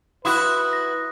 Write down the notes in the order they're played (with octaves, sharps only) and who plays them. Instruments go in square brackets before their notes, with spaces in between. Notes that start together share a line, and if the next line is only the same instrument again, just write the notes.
[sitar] E4 F#4 [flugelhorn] B4 [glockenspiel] C6 D#6 F#6
[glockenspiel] A#6